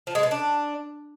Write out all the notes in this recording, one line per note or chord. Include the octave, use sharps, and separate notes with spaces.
F3
G#3
B2
D4